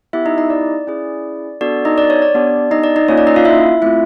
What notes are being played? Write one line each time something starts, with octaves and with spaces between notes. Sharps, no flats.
B3 E4 G4 E5
D#4 D#5
D#4 D#5
D5
C#4 E4 G#4
B3 D4 F#4 A4 D5
D#4 D#5
D5
C#5
D5
B3 D4 G4
D#4 D#5
D5
D#4 D#5
A#3 C#4 F4 C#5
D5
D#4 D#5
F4 F5
E4 E5
A3 C4 E4 F4 E5